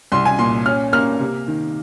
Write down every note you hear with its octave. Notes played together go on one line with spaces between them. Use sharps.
C2 C6
G#5
A#2 C6
C#4 F6
A#3 F6
C3
D#3